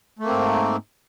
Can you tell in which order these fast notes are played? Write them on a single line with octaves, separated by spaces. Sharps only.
A3 A#3 C4 G#2